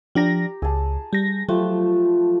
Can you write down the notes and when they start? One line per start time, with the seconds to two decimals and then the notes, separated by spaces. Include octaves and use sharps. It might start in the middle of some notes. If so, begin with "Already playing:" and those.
0.15 F3 D4 G4 A#5 A#6
0.62 C#2 G#4 A5
1.13 G3 A#6
1.49 F3 F#3 A3 G4